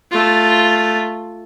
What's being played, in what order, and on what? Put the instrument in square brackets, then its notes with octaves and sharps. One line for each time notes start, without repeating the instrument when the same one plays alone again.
[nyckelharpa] A3 F4